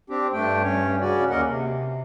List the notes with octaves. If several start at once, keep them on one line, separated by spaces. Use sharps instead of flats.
C4 D4 G4
G2 A3 D4 G5
G2 C#4 C#5
C#3 C#4 F#4 D5
D#2 A#3 C#4 A#4 D#5 F#5
C3